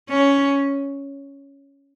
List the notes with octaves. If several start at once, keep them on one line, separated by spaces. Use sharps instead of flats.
C#4